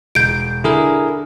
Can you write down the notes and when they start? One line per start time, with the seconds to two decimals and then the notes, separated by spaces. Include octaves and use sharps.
0.15 E1 G6 D7
0.64 D3 E4 G#4 A#4